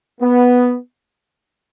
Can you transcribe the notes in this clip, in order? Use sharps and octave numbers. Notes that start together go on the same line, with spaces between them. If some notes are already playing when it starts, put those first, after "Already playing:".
B3